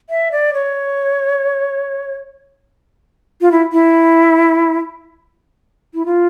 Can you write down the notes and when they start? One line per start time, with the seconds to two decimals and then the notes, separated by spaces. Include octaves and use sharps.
0.10 E5
0.32 D5
0.54 C#5
3.41 F4
3.52 E4
3.72 E4
5.94 E4
6.06 F4